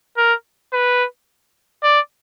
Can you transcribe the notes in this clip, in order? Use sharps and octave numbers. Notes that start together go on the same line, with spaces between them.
A#4
B4
D5